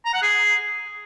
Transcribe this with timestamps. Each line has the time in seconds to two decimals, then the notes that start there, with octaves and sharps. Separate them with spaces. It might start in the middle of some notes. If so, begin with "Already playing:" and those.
0.06 A#5
0.14 F#5
0.23 G#4